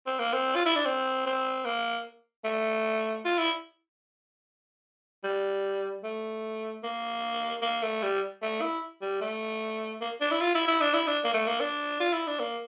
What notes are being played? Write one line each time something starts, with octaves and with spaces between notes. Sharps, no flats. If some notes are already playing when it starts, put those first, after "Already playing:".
C4
A#3
C4
F4
E4
D4
C4
C4
A#3
A3
F4
E4
G3
A3
A#3
A#3
A3
G3
A3
E4
G3
A3
A#3
D4
E4
F4
E4
E4
D4
E4
D4
A#3
A3
A#3
D4
F4
E4
D4
A#3